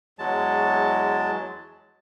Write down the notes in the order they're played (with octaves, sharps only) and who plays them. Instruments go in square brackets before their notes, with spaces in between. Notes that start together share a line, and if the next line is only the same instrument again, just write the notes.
[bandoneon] E2 F#3 G#3 A5